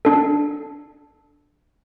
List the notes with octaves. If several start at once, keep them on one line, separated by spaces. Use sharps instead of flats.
D4 A4